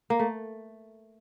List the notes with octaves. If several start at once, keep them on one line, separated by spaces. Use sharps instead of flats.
A#3
A3